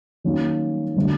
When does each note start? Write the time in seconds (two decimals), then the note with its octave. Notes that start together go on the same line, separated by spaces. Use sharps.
0.24 D#3 F#3 A#3 C#4
0.96 D3 F#3 A3 D4